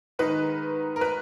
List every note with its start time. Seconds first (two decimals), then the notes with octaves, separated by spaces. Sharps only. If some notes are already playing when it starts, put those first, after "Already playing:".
0.19 G#2 D#3 G#3 D#4 B4
0.96 A#4
1.01 B4